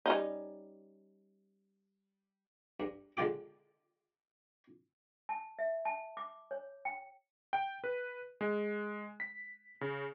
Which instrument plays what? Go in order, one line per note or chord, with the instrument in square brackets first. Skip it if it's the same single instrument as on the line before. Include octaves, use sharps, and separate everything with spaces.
[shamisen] G3 C#4 D#4
[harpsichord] G2
D3 G#3 F4 G4 D6
[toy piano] A5
E5
A5
D6
C#5
G5
[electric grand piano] G5
B4
G#3
B6
C#3